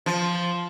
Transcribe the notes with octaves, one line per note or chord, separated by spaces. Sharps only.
F3